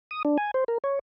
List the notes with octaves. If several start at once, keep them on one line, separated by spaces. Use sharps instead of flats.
D#6
D4
G#5
C5
A#4
C#5